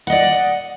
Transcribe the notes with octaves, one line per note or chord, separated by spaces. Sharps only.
D5 D#5 F#5